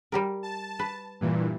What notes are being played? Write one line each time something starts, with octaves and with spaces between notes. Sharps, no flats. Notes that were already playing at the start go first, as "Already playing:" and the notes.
G3 G4 A#4
A5
B4
G2 A#2 E3